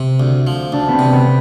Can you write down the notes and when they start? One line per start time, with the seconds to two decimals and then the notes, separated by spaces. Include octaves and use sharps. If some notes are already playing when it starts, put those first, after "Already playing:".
Already playing: C3
0.20 D2
0.47 F3
0.72 D2 D4
0.88 B3 C4
0.99 C3
1.13 B3